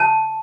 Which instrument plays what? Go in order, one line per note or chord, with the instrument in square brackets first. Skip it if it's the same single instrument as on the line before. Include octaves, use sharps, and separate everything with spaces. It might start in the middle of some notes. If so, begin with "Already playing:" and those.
Already playing: [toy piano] A5